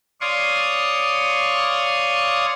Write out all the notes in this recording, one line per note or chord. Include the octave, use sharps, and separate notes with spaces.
C#5 D5 F5 C6 C#6 D#6